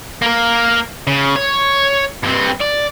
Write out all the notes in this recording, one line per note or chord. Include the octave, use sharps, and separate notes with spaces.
A#3 A#4
C#3
C#5
G2 C4
D5